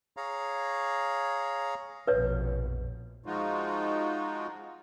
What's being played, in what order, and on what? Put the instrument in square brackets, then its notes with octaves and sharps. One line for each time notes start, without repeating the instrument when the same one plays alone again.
[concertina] G#4 C#5 F5 A#5
[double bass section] A#1 F2 B2 [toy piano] B4 C#5
[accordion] F3 G#3 D#4 F4 F#4